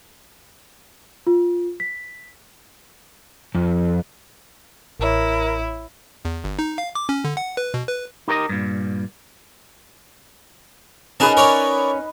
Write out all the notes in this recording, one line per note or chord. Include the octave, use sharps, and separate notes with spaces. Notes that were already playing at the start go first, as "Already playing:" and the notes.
F4
B6
F2
A1 E4 A#4 C#5
E2
G1
D#4
F5
D6
C#4
D3
F#5
B4
B2
B4
D#4 G4 A#4 D5 D#5
G2 A#2
C#4 D#4 G#4 A#4 B4 D#5 A5
A#4 C#5 D5